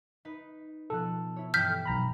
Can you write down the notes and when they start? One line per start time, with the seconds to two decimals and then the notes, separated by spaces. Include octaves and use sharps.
0.25 D#4 B4
0.90 B2 F3 A4 F#6
1.36 E4 C#5
1.54 G2 E3 G5 F6 G6 B6
1.86 B1 A#5 B5